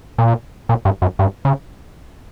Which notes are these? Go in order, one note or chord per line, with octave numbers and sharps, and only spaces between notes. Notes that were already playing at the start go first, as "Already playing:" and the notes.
A#2
A#2
G2
F#2
G2
C#3